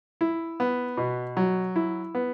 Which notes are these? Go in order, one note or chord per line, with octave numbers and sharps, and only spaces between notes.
E4
B3
B2
F#3
E4
B3